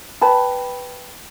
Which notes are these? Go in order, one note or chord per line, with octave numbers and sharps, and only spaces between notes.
B4 G5 A5 B5